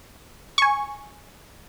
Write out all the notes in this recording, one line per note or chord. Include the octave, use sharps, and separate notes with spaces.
G#5 C#6